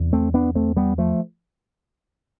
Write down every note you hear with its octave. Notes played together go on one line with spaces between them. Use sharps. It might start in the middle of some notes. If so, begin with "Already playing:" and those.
Already playing: E2 C3
A3 C4
B3 D4
A3 C4
G3 B3
F3 A3